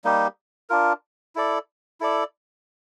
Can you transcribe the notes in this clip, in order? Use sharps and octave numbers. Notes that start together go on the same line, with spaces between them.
G3 A#3 D#4 G4
D4 F4 A#4
E4 A4 D5
E4 A4 D5